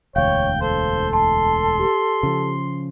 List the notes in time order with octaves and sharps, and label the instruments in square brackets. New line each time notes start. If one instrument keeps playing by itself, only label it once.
[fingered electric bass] E1 D2 [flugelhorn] C#5 [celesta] F5 [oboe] G5
[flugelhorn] A4 [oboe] C5
[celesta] A5 [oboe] C6
[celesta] G4
[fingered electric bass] C#3 F3